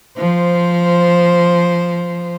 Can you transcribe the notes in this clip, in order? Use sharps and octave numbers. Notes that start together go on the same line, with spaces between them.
F3 C5